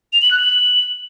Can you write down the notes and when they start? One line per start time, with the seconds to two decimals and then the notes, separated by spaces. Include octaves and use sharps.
0.13 F7
0.22 F#7
0.31 F#6
0.40 F#7